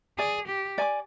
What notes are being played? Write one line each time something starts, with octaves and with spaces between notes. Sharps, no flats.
G#4 D5 G#5 D6
G4
D5 G#5 D6